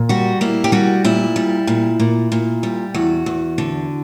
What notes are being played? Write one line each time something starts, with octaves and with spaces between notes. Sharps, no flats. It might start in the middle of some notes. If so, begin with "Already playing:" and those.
Already playing: A#2
G3 F#4
A#3 E4
G4
G3 F#4
A#2 E4
G3
A#2
A#2
A#2
G3
E2 F#4
E2
D3